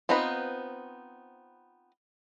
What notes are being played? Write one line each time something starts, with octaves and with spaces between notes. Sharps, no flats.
B3 C4 D#4 F4 B4